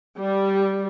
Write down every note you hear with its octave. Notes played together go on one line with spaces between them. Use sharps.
G3